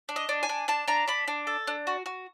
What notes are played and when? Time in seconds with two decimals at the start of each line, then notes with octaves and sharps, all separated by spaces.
0.09 D4
0.16 D#5
0.29 D4
0.43 G#5
0.49 D4
0.68 D4 A5
0.87 D4 A#5
1.08 D4 B5
1.28 D4
1.47 A4
1.67 D4
1.87 F#4
2.06 F#4